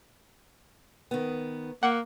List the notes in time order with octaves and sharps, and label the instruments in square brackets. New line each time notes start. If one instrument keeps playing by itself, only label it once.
[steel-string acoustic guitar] D#3 B3
[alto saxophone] A#3 [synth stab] F#5